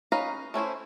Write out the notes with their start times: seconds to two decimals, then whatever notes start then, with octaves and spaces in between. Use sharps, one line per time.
0.12 C#4 D#4 B4 F5 A#5
0.54 A3 C#4 E4 C5